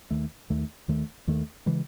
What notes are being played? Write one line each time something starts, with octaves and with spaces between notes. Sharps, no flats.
D#2 D#3 A3
D#2 D#3 A3
D#2 D#3 A3
D#2 D#3 A3
C#3 E3 G#3